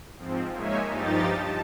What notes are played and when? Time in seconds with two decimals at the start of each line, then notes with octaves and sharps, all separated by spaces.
0.17 G#2 F3 C4
0.51 G#3 A#3 D#4 C#5 E5 G#5
0.87 G2 F3 D#4 G4 A6
1.30 A5